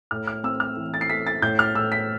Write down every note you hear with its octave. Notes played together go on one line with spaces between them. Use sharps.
A2 F6
F6
C4 E6
F6
E3
A6
C7
A3 B6
A6
A2 G6
F6
A2 E6
B6